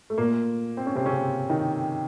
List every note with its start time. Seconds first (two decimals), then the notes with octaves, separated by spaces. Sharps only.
0.10 A3
0.18 A#2 A#3
0.77 C4
0.87 C#4
0.95 C3 C4
1.06 C#3 C#4
1.50 D#3 D#4